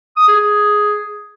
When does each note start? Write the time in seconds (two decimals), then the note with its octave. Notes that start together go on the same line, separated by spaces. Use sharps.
0.17 D#6
0.28 G#4